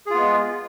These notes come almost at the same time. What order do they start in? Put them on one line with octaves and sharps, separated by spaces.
G#4 F4 B3 G#3